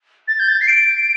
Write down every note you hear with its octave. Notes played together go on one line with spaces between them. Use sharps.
A6
G6
A6
C7
D7